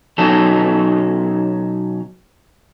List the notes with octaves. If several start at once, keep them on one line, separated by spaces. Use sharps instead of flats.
B2 F#3 C#4 D#4 A4